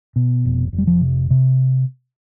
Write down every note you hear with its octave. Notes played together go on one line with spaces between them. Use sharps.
B2
F1
F1
G3
F3
C3
C3